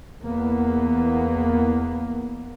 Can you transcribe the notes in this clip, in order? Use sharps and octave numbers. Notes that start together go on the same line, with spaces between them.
E2 A#3 B3